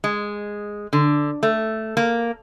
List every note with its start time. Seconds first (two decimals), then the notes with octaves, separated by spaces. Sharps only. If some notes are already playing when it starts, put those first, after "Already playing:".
0.04 G#3
0.93 D3
1.43 A3
1.97 A#3